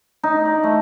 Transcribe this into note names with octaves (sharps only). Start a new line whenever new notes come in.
D#4
D5
A3